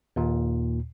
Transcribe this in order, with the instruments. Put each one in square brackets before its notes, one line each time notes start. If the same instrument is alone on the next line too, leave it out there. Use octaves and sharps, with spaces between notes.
[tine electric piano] D#2 A#2